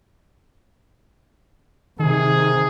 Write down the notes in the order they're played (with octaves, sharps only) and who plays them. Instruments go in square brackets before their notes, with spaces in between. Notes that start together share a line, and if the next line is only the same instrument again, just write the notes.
[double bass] C3 [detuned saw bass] D#3 [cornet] G#4